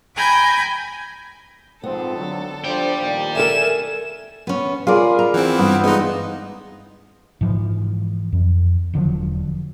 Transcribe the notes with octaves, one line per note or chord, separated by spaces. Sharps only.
G5 G#5 A#5 B5 G6 G#6
G#2 F3 B3 C4 A4
D3 F#3
F3 D4 C5 D5 G5
D#2 A#2
A4 A#4 E5 G#5 E7
B3 C#4
F4 G#4 A#4 D5 B5
A#5
E3 C4 F#5
G2 B3
G#3 B3 D#4
G#2 E3 F3
F2
E1 D3 F3 F#3